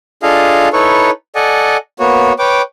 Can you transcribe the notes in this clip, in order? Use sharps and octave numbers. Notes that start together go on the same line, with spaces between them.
D4 F4 G#4 A4 D#5 F5
D#4 E4 A4 B4 C#5 C#6
A4 D5 D#5 F#5 G#5
A#3 B3 F#4 C#5
B4 C#5 G5 D6